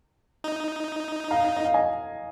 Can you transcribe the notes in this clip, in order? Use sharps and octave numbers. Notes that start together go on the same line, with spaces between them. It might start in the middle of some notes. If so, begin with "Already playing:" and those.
D#4
F5 A#5
D#5
F5
D#5 G#5